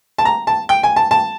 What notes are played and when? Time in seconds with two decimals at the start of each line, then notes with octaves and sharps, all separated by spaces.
0.18 A5
0.25 A#5
0.47 A5
0.69 G5
0.83 G#5
0.96 A5
1.11 A5